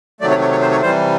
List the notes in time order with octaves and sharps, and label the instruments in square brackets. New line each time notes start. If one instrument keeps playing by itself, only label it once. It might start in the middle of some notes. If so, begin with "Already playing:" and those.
[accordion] C3 D#3 F#3 A3 D5
C#5
C#5
C#5
C5
C#5
C3 E3 G3 C5